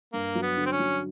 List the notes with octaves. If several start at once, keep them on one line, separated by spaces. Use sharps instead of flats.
G2 A#3
F#3
B3
D3
C4
C#4
F#3